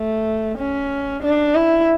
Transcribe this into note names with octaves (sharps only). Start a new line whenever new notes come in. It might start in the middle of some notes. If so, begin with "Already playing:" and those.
Already playing: A3
C#4
D4
E4